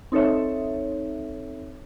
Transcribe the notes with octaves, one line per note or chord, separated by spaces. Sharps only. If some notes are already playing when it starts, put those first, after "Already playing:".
C4 D#4 A4 C#5 E5